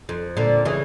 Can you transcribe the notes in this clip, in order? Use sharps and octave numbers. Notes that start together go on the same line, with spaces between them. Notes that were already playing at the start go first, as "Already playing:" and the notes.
F2
A#2 D3
C#3 E3